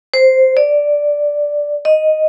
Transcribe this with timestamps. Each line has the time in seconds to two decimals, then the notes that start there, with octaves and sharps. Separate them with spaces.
0.14 C5
0.57 D5
1.85 D#5